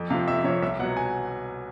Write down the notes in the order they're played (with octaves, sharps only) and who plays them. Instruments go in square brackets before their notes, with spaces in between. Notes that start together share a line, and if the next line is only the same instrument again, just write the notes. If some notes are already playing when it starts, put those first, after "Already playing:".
Already playing: [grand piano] F2
C3 F3 F5
F2 E5
C3 C#5
F3
C2 E5
B2 F#5
F#3
G#5